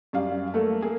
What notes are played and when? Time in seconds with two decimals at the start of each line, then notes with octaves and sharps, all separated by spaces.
0.13 F#2 G3 D5 F5
0.54 A3 A#3 A4
0.82 A#3 G#4